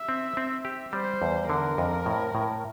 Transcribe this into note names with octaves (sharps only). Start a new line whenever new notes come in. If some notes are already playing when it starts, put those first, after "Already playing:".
Already playing: E5
C4
C4
G4
G3 C5
E2
D3 A#4
F2
A2
A2